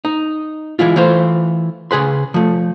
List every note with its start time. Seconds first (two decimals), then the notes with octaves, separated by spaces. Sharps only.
0.05 D#4
0.79 E3 G#3 E4 F4
0.96 E3 A3 F4 C5
1.91 C#3 G#4 B4 C6
2.34 F3 A3